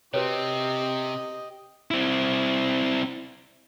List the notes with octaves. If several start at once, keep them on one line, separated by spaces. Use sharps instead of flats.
C3 C4 F#4 G4 B4 C#5 D#5
C4 E4